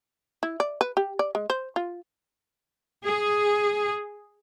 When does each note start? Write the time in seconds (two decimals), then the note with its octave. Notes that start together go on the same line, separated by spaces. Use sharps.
0.43 E4
0.60 D5
0.81 B4
0.97 G4
1.19 D5
1.35 G#3
1.50 C5
1.76 F4
3.04 G#4